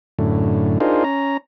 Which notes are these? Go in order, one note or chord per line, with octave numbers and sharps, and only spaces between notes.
F#2 A2 D3
D4 D#4 F4 G#4 A#4 C5
C#4 A#5